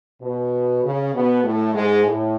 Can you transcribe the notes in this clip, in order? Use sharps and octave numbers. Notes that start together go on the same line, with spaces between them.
B2
C#3
B2 B3
A2 A3
G#2 G#3
A2